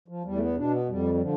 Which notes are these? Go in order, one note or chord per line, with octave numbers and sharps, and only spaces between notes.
F3
E2 G3
A3
B3
B2 D4
B3
F2 G3
G3
D3 F3